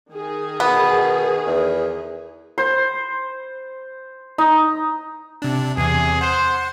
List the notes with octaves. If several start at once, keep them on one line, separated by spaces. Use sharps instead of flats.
D#3 G#4
B2 B3
E2
C5
D#4
C3 D4
E2 C3 G#4
C5 F#5